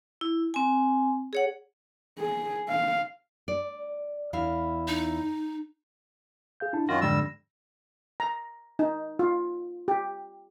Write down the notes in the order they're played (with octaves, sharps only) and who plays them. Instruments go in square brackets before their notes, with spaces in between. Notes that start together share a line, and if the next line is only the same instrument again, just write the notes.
[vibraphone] E4
C4 G#5
G#4 C#5 F#5
[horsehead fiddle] G#4
F5
[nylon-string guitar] D5
E2 E4 F5
[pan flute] D#4
[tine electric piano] G#4 F5 G6
D4 E4 A5
[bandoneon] F#2 D#3 F4 [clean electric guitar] F#4 [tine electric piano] A#6
[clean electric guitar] F2 G#2 D3 [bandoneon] G3 E6
[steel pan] A#5
D#4
F4
G4